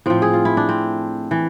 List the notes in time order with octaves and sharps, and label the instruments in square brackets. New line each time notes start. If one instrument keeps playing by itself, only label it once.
[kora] A2 F3 C4
G#4
F4
E4
D4
C4
E3